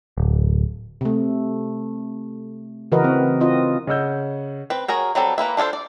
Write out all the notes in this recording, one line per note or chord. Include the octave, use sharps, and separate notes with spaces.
D1
C3 A3
C#3 E3 F#4 A#4 B4 D#5
C4
C4 F4 D#5
C#3 D#5 F#5 E6 G6
C4 B4
F#4 G#4 A#4 C#5
F#3 G3 C4 A4
E3 A#3 B4 E5
D4 F4 G#4 A4 C5
D5